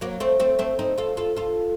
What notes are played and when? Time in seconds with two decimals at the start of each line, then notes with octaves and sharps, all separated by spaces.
0.01 F#3 A#3
0.20 A3 C4
0.40 A3 C4
0.59 A3 C4
0.79 C4 D#4
0.98 F4 A4
1.17 F4 A4
1.36 F4 A4